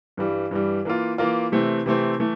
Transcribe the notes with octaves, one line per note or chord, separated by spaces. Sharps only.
G2 E3 G3
G2 E3 G3
E3 A#3 F4
E3 A#3 F4
C3 E3 A3 C4
C3 E3 A3 C4
E3 A3